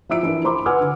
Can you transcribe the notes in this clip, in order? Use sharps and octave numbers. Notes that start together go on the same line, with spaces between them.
F3 E4 E5 E6 D7
E3 D4 A#4
A#4 C5 B5 C6 D6
B4 F#5 G#5 D6 E6 F6
D3